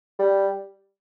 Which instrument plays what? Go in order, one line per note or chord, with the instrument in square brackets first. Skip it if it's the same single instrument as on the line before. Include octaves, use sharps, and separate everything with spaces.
[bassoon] G3